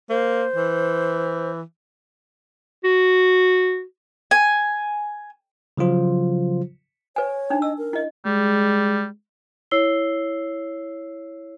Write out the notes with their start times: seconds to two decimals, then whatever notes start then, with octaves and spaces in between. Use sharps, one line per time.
0.10 A#3 C5
0.56 E3
2.84 F#4
4.31 G#5
5.77 C#3 F3 F#3 F4 C5
7.16 B4 C#5 G#5
7.50 D4 D#4
7.62 D#5 E6
7.78 A#4
7.93 E4 D#5
8.26 G3 G#3
9.71 E4 C#5 E6 C7 G7